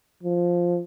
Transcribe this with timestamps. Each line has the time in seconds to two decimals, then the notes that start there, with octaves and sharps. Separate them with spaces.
0.23 F3